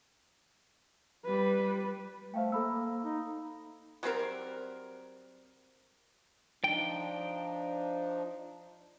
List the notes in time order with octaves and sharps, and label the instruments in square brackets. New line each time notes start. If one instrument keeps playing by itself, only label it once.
[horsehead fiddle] G3 B4
[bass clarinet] A3 [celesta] C5 F5 G5
[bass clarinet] A#3 [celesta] A4 B5 E6
[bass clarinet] A#3
D#4
[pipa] F#3 G3 C4 A#4
[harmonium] F3 D4 D#4 [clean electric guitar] G5